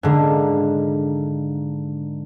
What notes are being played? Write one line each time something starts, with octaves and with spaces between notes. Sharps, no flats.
G#2 D3 A#3